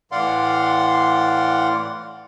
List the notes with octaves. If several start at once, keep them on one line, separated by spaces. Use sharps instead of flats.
A2 E3 D5 F5 F#5 C6